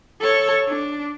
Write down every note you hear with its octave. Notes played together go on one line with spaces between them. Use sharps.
A4 C#5
D4